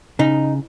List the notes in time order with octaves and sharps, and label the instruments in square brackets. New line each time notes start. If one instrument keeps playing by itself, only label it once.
[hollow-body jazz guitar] C#3 [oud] D#4